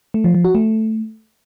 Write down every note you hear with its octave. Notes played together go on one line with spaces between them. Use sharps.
A3
F3
F3
F#4
A3